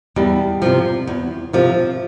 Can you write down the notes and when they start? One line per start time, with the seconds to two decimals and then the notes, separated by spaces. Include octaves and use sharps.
0.16 E2 G3
0.62 C3 F3
1.07 E2
1.53 C3 F3